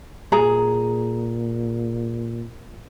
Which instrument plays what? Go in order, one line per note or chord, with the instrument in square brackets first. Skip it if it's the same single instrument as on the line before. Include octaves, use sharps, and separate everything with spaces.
[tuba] A#2 [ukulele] G#4 A#5